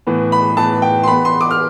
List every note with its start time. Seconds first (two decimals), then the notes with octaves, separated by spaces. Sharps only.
0.07 A2 E3 B3
0.32 B5
0.57 A2 E3 B3 A5
0.82 G5
1.03 C6
1.07 E3 B3 B5
1.25 C6
1.41 D6
1.51 F6